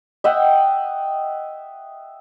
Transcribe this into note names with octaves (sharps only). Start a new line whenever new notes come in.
D#5 E5 F#5 G5